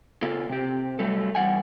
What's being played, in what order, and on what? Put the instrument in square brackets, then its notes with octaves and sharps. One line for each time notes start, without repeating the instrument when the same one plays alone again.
[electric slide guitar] C#3 A#3 F4 A4
C3 G4
F#3 G3 A3 A4
E2 G3 F#5 G#5